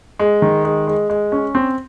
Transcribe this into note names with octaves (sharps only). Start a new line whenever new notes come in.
G#3
D#3
G#3
G#3
G#3
C#4
C4